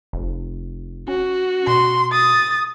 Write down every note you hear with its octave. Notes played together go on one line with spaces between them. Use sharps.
F1
C#4 F#4
B2 C6
D#6 A6